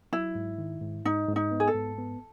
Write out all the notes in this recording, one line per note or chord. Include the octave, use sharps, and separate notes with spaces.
F#3 E4
G#2
D#3
G#2
G#2 D#4
G#2
D#4
B3
G#4
A4
G#2
B3